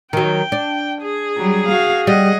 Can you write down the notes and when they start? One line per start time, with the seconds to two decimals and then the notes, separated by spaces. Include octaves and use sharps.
0.13 D#3 F#3 G5
0.52 D4
1.02 G#4
1.37 F#3 G3
1.68 F#4 F5
2.07 G3 D#5 F#5